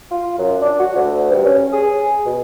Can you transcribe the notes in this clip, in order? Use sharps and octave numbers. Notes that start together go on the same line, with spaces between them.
F4
F#2
D4
F#4
D2
G2
C#4
G#4
B2